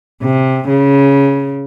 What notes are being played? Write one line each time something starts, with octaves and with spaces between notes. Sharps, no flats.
C3
C#3